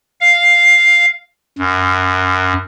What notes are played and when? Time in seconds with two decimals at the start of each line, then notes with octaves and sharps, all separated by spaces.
0.20 F5
1.58 F#2